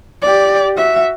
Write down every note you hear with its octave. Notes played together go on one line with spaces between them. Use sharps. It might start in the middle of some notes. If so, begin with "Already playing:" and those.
G4 D5
F#4 E5